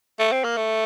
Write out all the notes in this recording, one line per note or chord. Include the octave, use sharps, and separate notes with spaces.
A3
C4
A#3
A3